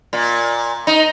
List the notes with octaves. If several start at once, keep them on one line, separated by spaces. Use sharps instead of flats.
A#2
D#4